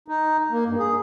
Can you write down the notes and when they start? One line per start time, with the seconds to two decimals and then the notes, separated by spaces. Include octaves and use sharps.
0.08 D#4
0.51 A#3
0.66 G2
0.79 G#4